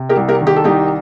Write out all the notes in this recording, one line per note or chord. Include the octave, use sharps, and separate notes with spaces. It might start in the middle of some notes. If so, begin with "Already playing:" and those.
Already playing: C3
G4 A#4
C2
G4 A#4
D#3
G4
A4
C2 D#4 G4